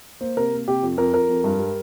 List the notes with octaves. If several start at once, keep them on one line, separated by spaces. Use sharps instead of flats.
A#3 C5
C3 A#4
A#3
C3 G4
F2
F2 A#4
F2 A#4
F2
G2
G3